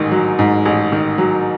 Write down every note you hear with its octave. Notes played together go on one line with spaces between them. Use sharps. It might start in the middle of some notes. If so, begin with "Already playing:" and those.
Already playing: A1 G#2 D#3
F#3
G#2
A1
D#3
F#3